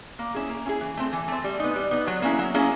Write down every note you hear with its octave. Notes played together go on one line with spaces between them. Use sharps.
A#3
C#4 E4 G#4
A#3
C#4 E4 G#4
E3
A3 C4
E3
A3 C4
G3
B3 D#4
G3
B3 D#4
F#3
A#3 C#4 E4 G#4
F#3
A#3 C#4 E4 G#4